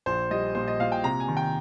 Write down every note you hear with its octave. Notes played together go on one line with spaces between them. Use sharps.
A#1 C5
G3 D#5
A#2 C5
D#5
A#2 F5
G5
C3 A#5
G#5
D#3
G5